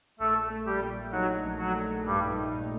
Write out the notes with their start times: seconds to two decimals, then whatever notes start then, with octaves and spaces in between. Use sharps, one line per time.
0.19 A#1 A3 A4
0.50 A3
0.66 G3 G4
0.82 A#2
1.12 F#3 D#4 F#4
1.44 A#1
1.59 F#3 F#4
1.75 A3
2.05 G2 A#2 G3
2.36 D#4